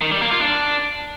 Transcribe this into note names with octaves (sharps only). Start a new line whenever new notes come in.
D#3
G3
A#3
F4
D4